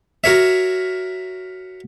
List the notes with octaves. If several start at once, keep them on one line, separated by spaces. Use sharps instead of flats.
F#4 A#4 C#5 E5